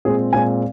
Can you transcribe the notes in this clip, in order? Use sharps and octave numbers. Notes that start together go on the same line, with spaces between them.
A#2 G#3 C4 G#4
A#2 G#3 C4 G#5